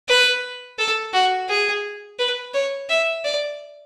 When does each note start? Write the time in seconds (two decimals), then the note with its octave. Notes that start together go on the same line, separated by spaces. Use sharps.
0.08 B4
0.78 A4
1.13 F#4
1.49 G#4
2.19 B4
2.54 C#5
2.90 E5
3.24 D5